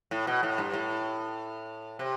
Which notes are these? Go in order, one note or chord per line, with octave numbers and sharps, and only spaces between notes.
A2
B2
A2
G2
A2
C3